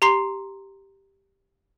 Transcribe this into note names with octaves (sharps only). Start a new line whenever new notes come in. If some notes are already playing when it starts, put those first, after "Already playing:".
G4 A#5 C6 C7